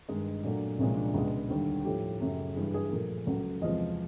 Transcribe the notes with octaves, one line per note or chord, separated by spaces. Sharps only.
G2 D#3 G#3 D#4
A#2 F#3 A3 D4
C2 A#2 F3 G#3 C#4
D4
C#2 B2 G#3
D#2 D3 G3
A2 F3 A3 G4
F#2 C#3 F#3 A3
G2 E3 G3 G#4
G#4
A#2 F3 A3 A#4
C#2 C#3 F#3 A3
E2 C3 F3 G#3 D#5